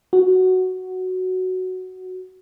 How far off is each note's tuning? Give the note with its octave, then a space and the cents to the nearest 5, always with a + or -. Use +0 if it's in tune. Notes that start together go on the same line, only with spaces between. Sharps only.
F#4 +5